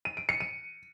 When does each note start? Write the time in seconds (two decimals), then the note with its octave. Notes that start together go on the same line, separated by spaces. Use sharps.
0.05 D#7
0.17 D7
0.29 C#7
0.40 D#7